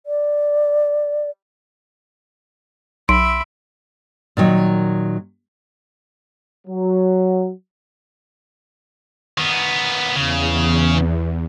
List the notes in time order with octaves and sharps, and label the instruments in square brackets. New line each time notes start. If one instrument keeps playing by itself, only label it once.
[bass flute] D5
[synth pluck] B1 [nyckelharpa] E5 B5 [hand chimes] C6 D7
[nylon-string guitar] A#2 D#3 F#3
[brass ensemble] F#3
[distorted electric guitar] D#3 B3
[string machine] E2 [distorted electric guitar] C#3